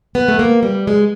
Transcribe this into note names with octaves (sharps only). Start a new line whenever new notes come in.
B3
A3
A#3
G3
G#3